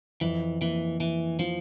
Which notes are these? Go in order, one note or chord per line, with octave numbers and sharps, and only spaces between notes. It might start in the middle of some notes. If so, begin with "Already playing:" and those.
F2 E3
E3 A#3
E3 A#3
E3 F3